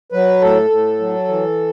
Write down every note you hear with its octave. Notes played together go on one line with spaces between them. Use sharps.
F#3 B4
A2 A4
A2
F#3
E3